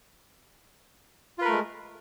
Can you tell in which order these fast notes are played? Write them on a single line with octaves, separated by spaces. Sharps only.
F4 B4 A#4 A3 G#3